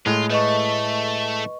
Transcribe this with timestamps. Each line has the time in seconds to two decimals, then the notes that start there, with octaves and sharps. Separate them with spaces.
0.06 A2 G#3 F4
0.30 A3 B4 D#5 C#6